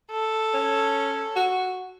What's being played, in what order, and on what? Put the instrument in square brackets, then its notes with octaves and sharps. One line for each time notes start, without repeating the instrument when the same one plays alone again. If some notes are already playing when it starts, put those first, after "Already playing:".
[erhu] A4
[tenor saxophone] C#4
F#4